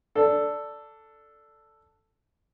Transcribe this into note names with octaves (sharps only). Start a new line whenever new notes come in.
D4 A4